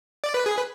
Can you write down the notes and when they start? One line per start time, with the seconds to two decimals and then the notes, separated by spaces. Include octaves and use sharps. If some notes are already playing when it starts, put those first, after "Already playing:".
0.24 D5
0.34 B4
0.46 G#4
0.57 B4